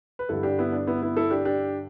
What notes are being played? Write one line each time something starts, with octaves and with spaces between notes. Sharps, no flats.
B4
G2 D3 G3 E4 A4
D4 G4
B3 E4
D4
B3 E4
B3 E4
E4 A4
D4 G4
D4 G4